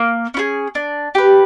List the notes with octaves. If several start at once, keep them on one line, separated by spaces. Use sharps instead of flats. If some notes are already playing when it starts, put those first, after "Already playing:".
Already playing: A#3
C#4 E4 G#4
D4
G4 B4